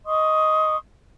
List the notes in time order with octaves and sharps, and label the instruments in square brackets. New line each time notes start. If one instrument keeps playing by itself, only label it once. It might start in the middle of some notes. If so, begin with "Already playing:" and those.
[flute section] D#5 C6 C#6 D#6